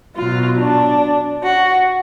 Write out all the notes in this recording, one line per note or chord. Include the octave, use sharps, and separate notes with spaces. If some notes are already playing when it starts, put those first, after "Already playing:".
B2 F#3 F4
D4
F#4